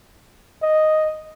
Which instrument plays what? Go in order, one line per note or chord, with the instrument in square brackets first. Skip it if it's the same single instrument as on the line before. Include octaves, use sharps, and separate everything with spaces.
[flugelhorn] D#5